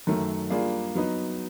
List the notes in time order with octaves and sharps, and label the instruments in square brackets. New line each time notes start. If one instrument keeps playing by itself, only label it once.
[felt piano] F#2 D#3 F#3 A3
G3 A#3 D4 F4 G#4
F#3 B3 D#4